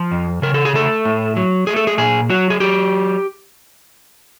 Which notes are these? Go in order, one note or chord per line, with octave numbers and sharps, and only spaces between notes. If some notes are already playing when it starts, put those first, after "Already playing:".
Already playing: F3
F2
C#3 A#4
A4
G#4
A3 A4
A2
F#3
A3 G#4
A4
G#4
A#2 G#4
F#3 F#4
G#4
F#3 G4